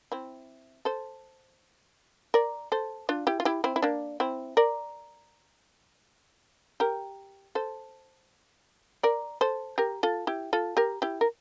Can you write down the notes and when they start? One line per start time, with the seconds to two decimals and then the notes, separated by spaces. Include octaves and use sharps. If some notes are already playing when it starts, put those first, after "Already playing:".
0.12 C4 E4
0.85 A4 C5
2.34 A#4 D5
2.72 A4 C5
3.09 D4 F4
3.27 E4 G4
3.40 F4
3.45 E4 G4
3.64 C4 E4
3.76 E4
3.82 A#3 D4
4.20 C4 E4
4.57 A#4 D5
6.80 G4 A#4
7.55 A4 C5
9.03 A#4 D5
9.41 A4 C5
9.78 G4 A#4
10.03 F4 A4
10.27 E4 G4
10.53 F4 A4
10.77 G4 A#4
11.02 E4 G4
11.21 A#4